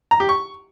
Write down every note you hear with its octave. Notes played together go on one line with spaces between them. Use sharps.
A#5
G4
C#6